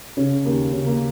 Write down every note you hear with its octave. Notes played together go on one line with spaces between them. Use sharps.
C#3 C#4
D#2 A#3
C#3 C#4
A#3